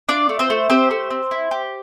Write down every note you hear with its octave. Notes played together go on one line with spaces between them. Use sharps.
D4 F4 D5
A3
C4 C5
A3
C4 G4 C5
A3
C4
E4
G4